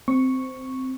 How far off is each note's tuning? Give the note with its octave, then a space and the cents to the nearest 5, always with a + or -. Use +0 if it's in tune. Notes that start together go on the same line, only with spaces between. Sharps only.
C4 -10 C#6 +0